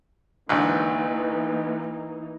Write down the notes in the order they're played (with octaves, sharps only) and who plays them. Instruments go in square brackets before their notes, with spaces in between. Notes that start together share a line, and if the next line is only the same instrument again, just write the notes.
[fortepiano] G#1 D2 [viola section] E3 A#3 D#4